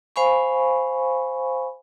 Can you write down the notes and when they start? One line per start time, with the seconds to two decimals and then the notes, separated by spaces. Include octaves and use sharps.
0.16 C5 F5 G#5 B5 C#6